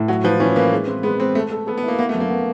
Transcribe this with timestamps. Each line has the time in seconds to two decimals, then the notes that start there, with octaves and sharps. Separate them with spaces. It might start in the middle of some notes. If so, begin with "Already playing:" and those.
Already playing: A2
0.08 F#3 F#4
0.24 F3 B4
0.40 E3 C#4
0.56 A#3 B4
0.72 G#3
0.87 C4
1.03 G#3 B3
1.20 G#3 C4
1.35 A3 A4
1.51 A4
1.67 B3 A4
1.78 B3
1.83 A#3 E4
1.99 A#3 B3
2.09 A3
2.15 F#2
2.20 A#3
2.30 B3